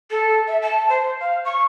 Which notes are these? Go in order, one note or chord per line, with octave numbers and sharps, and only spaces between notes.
A4
E5
A5
C5
F5
C#6